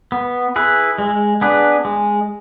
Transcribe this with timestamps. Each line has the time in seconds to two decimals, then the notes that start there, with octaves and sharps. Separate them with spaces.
0.12 B3
0.56 E4 G#4 B4
0.98 G#3
1.41 B3 D4 G#4 B4
1.85 G#3